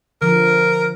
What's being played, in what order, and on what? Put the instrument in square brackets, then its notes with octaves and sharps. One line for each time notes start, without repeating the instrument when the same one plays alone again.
[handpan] D3 F3 [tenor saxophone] A#4